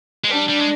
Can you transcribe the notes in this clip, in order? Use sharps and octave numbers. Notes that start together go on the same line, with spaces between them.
G#3
G3 D4
G3
G#3